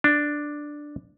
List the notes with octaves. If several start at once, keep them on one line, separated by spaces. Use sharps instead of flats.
D4